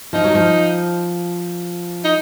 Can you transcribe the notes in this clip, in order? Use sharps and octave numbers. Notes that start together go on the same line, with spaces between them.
F3 D#4
F#3
F3
D#4